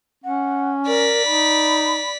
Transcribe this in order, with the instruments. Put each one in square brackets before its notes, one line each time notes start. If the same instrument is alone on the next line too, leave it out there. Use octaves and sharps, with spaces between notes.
[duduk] C#4 [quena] F#5
[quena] A#4 [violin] D5 B6
[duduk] D#4 [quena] B5